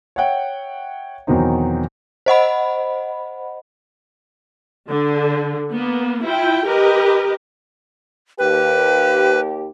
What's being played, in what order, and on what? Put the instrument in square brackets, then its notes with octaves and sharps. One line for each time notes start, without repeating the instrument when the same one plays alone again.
[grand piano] C#5 E5 F#5 G5
E2 B2 D#3 F#3 C4 D#4
[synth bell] C5 D#5 F#5 B5
[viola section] D3
A#3 B3
E4 F4 G5
G4 A#4 B4 D#5
[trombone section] D#2 G4 [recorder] B4